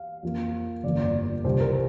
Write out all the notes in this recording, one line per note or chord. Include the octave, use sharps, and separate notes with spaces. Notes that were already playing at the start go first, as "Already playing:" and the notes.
Already playing: F5
F2 F3 A#3
G1 F2 F3 A#3 D5
D5
C2 C3 F3 C5
A#4